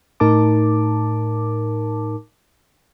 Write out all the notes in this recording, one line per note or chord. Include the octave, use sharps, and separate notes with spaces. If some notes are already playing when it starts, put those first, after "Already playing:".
A2 D#4 A#4 A5 D6